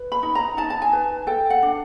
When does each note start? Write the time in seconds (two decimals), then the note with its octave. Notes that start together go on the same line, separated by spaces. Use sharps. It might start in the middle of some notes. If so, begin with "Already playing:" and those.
Already playing: B4
0.12 B5
0.23 D#4
0.35 A#5
0.57 D#4 A5
0.70 A5
0.82 G#5
0.93 B4
1.27 A4 G5
1.50 F#5
1.63 D4